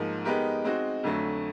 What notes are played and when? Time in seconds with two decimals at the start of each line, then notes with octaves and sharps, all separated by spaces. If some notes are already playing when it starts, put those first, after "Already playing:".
Already playing: G#2 F3 A#3
0.25 G#3 B3 D#4 G4 A#4
0.64 G#3 C4 D#4 F#4
1.03 F2 D3 F#3 A3